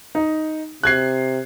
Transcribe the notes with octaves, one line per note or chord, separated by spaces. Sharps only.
D#4
C3 F#6 G#6 C7